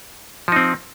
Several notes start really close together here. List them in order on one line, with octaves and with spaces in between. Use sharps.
F3 D#4 C4